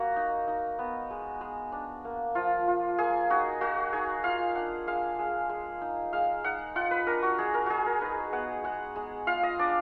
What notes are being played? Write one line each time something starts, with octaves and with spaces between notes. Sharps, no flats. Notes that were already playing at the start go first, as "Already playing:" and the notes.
Already playing: A#3 F#4
D#4
D#4
B3
G#3
G#3
D4
A#3
F3 F4
F4
A#3 G#4
D#4 F#4
A#3 F#4
D#4 G#4
F4 F5
D4 F#5
G#3 F5
G#3
G#3
D#4
G#3 F5
D#4 F#5
F4 F#5
B4
D4 A#4
F#4
G#3 G#4
A#4
G#3 F#4 G#4
A#4
D#4 B4
B3 F#5
G#3 F#5
G#3
F4 F5
D#5
D4 D5